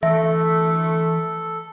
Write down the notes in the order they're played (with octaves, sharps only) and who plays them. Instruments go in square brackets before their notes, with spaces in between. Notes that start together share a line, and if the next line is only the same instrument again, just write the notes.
[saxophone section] D2 A3 [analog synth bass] E3 [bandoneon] A4 [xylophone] E5